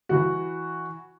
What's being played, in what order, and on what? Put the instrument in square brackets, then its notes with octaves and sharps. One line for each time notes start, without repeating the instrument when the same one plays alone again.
[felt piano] E3 F#4